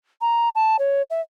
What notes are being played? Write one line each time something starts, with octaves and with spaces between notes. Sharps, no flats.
A#5
A5
C#5
E5